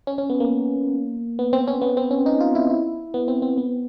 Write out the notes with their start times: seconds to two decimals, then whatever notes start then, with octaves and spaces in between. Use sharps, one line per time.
0.07 C#4
0.18 C#4
0.30 B3
0.40 A#3
1.39 B3
1.53 C4
1.68 C#4
1.82 B3
1.97 C4
2.11 C#4
2.26 D#4
2.40 F4
2.55 E4
2.70 E4
3.14 B3
3.28 C4
3.42 C4
3.58 B3